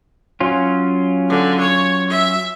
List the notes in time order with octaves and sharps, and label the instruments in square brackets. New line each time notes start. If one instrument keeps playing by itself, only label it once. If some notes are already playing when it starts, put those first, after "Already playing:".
[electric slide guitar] F#3 C#4 F4
[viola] D3
C#5
E5